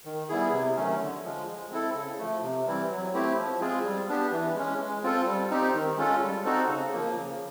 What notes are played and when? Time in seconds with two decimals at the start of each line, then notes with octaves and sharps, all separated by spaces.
0.05 D#3
0.29 G3 B3 E4 G#4
0.52 C3
0.76 D#3 F#3 A3 C#4
1.00 D3
1.24 F3 G#3
1.47 G#3
1.71 C4 E4 A4
1.94 C#3
2.18 F3 A3
2.42 C3
2.66 E3 G3 C4 E4
2.90 F#3
3.13 A3 C4 E4 G4
3.37 F3
3.60 G#3 C4 F4 G#4
3.84 G3
4.08 B3 D4 G4
4.31 E3
4.55 G#3 C#4
4.80 G#3
5.03 C4 F4 A4
5.26 G3
5.51 C4 D#4 G4
5.74 D#3
5.97 G#3 C#4 F4 A4
6.21 G3
6.44 C4 D#4 F#4 A4
6.68 C#3
6.93 F3 A#3
7.16 C#3